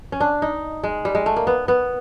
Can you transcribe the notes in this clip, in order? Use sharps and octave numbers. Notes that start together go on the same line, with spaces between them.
C#4
D4
D#4
G#3
G3
G#3
A3
A#3
B3
B3